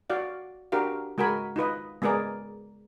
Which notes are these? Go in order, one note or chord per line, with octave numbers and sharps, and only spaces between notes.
F#4 D5 F5
D4 F#4 G4 A#4 F5
G#3 F#4 A#4 G#5 B5
D#4 F4 B4 D#5
G#3 B3 G#4 A#4 D5